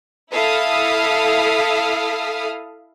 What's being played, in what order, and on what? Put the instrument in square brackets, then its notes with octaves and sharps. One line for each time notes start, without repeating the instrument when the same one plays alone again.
[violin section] E4 A4 E5 F5 D#6 F6